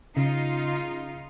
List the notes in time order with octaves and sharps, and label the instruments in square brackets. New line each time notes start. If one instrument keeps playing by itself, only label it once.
[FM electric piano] C#3 [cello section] D#4 F4